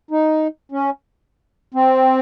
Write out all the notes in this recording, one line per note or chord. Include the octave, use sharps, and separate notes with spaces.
D#4
C#4
C4